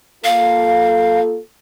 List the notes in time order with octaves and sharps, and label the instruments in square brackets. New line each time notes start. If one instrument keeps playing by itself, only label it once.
[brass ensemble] A#3 F4 A4 [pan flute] F5